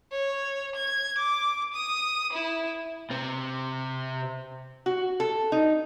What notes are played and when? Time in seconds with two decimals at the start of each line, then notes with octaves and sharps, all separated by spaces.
0.12 C#5
0.76 G#6
1.18 D6
1.73 D#6
2.33 E4
3.10 C3 C4
4.86 F#4
5.20 A4
5.52 D#4